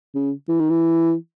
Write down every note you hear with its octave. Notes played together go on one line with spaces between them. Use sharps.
C#3
E3
D#3
E3